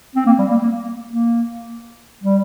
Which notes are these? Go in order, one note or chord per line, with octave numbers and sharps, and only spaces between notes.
C4
A#3
G3
A#3
A#3
A#3
G3